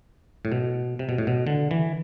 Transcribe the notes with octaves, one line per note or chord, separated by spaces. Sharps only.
A2
B2
C3
B2
A2
B2
D3
E3